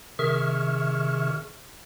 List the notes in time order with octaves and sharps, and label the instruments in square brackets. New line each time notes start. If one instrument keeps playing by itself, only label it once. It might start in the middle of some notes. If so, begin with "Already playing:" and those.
[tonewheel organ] C3 D#3 G#4 E5 C#6 F6